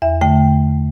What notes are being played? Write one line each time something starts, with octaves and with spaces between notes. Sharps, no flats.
E2 E5
D3 A3 G5